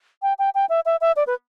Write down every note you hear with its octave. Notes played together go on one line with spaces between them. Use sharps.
G5
G5
G5
E5
E5
E5
D5
B4